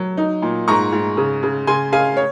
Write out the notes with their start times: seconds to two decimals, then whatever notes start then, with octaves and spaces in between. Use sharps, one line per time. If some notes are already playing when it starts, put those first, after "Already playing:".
Already playing: F#3
0.17 D#4
0.42 A#2
0.68 G#2 A#5 C#6
0.92 G#2
1.17 C#3
1.43 C#3
1.67 C#3 G#5 C6
1.92 C#3 F5 G#5
2.17 C#5